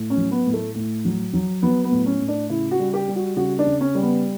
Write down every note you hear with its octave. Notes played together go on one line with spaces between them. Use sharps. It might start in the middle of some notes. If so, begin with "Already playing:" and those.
Already playing: A2
C#4
F#3
B3
A2
A3
A2
F#3
F#3
F#3 B3
B3
A2
C#4
A2
D4
C#3 E4
F#4
G3
G4
G3
F#4
C#3 F#4
D4
C#3
C#4
G3
B3